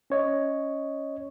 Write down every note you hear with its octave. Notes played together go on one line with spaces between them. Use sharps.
C#4 C#5 D#5